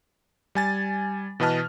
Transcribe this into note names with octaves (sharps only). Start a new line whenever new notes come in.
G3 G#5 A6
B2 E3 B4 D#5 A5 F6